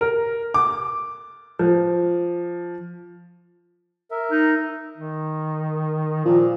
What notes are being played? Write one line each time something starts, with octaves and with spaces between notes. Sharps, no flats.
A#4
D6
F3
A#4 E5
D#4
D#3
A#2 F3